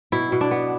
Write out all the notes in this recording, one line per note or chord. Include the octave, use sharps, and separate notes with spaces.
B2 E4
B2
D4
B3